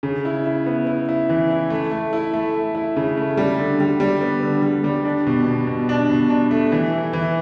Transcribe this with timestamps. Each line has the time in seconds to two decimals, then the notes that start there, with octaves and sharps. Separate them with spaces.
0.03 C#3
0.25 E4
0.46 E4
0.66 B3
0.87 E4
1.09 E4
1.29 E3
1.50 E4
1.70 A3
1.91 A3
2.13 E4
2.34 A3
2.54 A3
2.75 E4
2.96 C#3
3.17 A3
3.37 G3
3.59 D3
3.80 G3
4.00 G3
4.22 B3
4.43 D3
4.63 G3
4.84 G3
5.05 D4
5.26 B2
5.46 B2
5.67 B2
5.89 D4
6.10 B2
6.30 D4
6.51 A3
6.72 E3
6.93 E4
7.13 E3